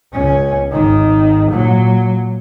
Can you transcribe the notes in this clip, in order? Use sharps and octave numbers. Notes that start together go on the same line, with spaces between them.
C#2 C#4
G#1 D#3
A#2 F#3